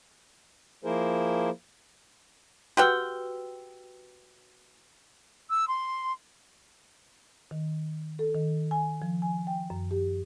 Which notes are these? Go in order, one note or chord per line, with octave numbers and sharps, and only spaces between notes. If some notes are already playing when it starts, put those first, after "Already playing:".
F3 A#3 E4 G#4 A#4 C5
F#4 G4 B4 F#5 G5 E6
E6
C6
D#3
A4
D#3
G#5
F3
G#5
G5
F#2
G4